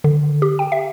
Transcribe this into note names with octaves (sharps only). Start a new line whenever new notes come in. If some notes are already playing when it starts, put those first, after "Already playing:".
D3
G4
G5
E5